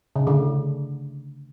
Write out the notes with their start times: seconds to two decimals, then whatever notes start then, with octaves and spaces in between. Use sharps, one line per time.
0.16 C#3
0.27 D3